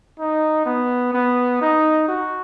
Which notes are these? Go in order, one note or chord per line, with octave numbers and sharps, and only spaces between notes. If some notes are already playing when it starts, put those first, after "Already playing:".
D#4
B3
B3
D#4
F#4